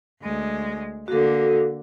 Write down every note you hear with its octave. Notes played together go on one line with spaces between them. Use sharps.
D2 G#3
D3 A#3 F#4 A4